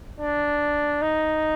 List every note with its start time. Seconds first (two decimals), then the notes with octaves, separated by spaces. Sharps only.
0.20 D4
1.02 D#4